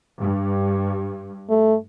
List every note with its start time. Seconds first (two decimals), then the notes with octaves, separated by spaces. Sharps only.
0.20 G2
1.49 A3